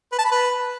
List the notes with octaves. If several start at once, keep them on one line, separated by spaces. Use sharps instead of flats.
B4
A5
B5
B4